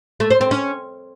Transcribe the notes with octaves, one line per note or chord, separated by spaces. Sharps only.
A3
C5
C4
C#4